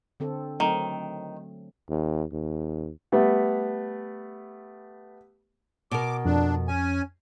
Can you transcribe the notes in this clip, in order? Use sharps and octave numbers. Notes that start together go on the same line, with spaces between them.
D3 C4 A4
D#3 F#3 A3 C4
D#2
D#2
G3 A3 B3
B2 A#4 D6
F2 D4
C#4 G#5